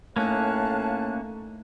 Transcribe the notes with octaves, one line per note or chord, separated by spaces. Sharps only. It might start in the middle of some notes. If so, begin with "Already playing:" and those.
A2 A3 A#3 C#4 D#4 F5 A5 F#6